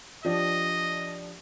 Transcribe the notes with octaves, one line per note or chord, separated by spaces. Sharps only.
F3 D4 G4 D#5